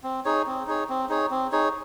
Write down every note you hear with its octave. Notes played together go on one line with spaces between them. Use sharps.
C4
D#4 G#4 C#5
C4
D#4 G#4 C#5
C4
D#4 G#4 C#5
C4
D#4 G#4 C#5